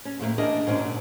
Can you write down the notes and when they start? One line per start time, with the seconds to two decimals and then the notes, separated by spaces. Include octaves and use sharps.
0.05 C#4
0.19 F2 A2 A3 A#3
0.38 E3 D4 G#4 A#4 D#5
0.67 G#2 B2 D3 C#4 D4
0.85 A#2